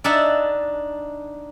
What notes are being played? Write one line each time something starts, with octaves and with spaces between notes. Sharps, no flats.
D4 D#4 E5 F#5 A5